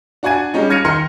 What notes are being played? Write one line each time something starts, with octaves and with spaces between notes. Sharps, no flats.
D4 F#4 D5 G#5 G#6 D#7
G3 G#3 C#4 D#4
F6 G#6 A#6 C#7 D#7 F7
D#3 A#4 C6 F6 C#7